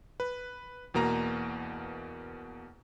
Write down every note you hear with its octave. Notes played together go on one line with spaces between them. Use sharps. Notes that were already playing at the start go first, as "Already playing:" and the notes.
B4
E2 B2 A#3 A#5